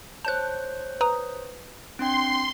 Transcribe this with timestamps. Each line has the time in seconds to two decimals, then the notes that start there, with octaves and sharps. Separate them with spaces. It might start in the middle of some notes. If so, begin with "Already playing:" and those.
0.25 C5 C#5 A5 F#6 G6
1.01 B4 A#5 D#6
1.99 C4 D4 G5 C6